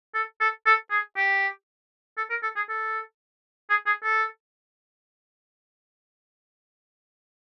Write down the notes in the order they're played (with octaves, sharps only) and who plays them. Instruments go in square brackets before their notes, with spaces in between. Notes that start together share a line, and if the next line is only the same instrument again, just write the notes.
[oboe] A4
A4
A4
G#4
G4
A4
A#4
A4
G#4
A4
G#4
G#4
A4